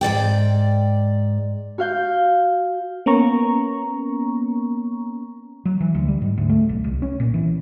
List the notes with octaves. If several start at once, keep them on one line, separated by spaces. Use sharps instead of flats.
G#2 D#3 D5 G5
F#4 F5 G6
A#3 B3 C#4 A#5 C#6
F#3
E3
D2
G3
G#2
D2
A3
B1
C2
C#4
A#2
E3